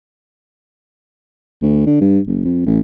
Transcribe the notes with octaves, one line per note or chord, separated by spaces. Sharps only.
D2
D3
G2
F#1
F2
A1